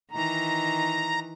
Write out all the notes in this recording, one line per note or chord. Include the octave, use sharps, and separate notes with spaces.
D#3 E3 A#5